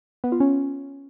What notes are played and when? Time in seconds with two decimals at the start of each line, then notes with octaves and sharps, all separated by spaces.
0.24 B3
0.32 F4
0.40 C#4